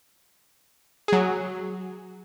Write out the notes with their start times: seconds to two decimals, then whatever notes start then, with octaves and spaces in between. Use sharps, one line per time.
1.08 F#3 G#4